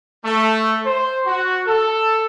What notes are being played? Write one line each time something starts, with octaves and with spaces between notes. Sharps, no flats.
A3
C5
F#4
A4